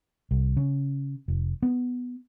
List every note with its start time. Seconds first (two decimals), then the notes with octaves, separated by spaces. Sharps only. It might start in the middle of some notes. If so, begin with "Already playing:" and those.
0.31 C2
0.57 C#3
1.28 F1
1.62 B3